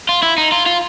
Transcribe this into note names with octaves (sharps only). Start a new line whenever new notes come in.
F4
E4
D#4
F4
F4